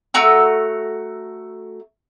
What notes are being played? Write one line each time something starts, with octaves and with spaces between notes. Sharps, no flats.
A3 F#4 A#5 E6